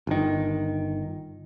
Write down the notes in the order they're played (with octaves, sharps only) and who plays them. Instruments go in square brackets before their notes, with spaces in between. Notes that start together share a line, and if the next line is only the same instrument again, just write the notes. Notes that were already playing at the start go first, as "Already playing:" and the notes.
[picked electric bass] G1 D#3